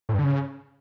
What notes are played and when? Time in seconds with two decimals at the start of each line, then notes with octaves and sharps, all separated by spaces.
0.09 A2
0.14 G2
0.19 D3
0.24 C#3